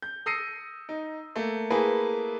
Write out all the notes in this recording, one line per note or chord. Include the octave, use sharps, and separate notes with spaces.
G6
D#6 E6 A#6 C7 C#7 D#7
D#4
A3 A#3
A3 A#3 E4 G#4 B4